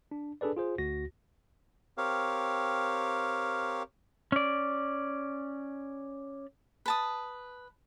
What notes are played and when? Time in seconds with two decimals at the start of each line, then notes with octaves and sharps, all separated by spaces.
0.11 D4
0.41 D4 G#4 A4 B4 D5
0.57 F4 G#4 C5
0.78 D2 F#4 A#6
1.98 C4 G4 A#4 C#5 F5
4.32 C#4 D5
6.86 B4 A5 D#6